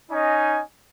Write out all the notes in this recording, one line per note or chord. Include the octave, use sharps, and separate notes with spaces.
C#4 D#4 D#5 G#5